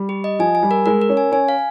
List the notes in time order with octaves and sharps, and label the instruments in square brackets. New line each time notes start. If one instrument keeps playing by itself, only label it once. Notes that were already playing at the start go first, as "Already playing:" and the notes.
Already playing: [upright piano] G3
[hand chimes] G4
D#5
[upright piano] F3 [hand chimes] G#5
[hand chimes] G#5
[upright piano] G3
[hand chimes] A#4
[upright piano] G#3 [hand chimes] A#4
[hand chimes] A#4
[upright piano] C#4
[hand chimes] G#5
[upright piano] C#4 [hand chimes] G#5
[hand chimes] F5